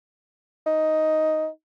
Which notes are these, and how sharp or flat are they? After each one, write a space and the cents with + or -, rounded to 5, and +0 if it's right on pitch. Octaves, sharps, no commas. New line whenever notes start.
D#4 +10